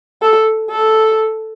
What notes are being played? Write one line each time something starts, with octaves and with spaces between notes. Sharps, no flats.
A4
A4